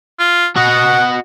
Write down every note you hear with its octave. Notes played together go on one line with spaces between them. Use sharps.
F4
F#4 D#5 F#5